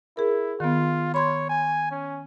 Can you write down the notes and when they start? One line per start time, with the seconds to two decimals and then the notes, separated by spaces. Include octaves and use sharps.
0.17 E4 G#4 A#4
0.60 D#3 B3 F4
1.14 C#5 B5 C6 G#6
1.49 G#5
1.91 C#4